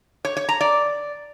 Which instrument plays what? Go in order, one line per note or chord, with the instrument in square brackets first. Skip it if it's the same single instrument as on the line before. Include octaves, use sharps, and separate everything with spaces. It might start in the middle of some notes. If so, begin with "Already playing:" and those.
[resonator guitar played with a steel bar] C#5
C#5
A#5
D5